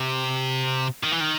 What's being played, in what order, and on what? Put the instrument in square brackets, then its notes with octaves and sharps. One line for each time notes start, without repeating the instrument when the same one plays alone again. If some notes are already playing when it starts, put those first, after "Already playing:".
Already playing: [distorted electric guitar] C3
D#3
E3
D#3